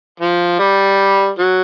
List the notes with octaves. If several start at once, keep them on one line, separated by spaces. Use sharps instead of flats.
F3
G3
F#3